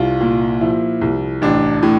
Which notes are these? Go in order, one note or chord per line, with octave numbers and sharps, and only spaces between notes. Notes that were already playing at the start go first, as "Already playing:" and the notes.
Already playing: C2 F4
A#2
F3 E4
C2
A1 D4
A2